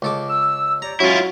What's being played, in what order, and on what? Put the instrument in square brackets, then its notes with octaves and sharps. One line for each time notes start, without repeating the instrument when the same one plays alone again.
[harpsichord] C#2 A4 D6
[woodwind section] E6
[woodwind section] G4 C#5 D5 [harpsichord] A#5
[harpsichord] F#3 [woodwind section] G#3 C#4 [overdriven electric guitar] E4 F4